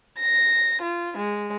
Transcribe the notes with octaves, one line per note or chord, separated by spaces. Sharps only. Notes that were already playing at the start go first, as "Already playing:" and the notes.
A#6
F4
G#3